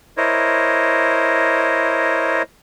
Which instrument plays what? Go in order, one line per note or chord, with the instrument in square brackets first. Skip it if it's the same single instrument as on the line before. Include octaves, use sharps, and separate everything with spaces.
[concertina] E4 A#4 C5 C#5 D#5